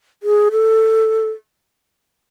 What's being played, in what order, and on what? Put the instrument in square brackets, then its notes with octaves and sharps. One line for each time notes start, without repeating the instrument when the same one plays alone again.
[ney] G#4
A4